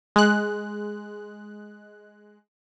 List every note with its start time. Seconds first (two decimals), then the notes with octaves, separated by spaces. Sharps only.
0.16 G#3 F#6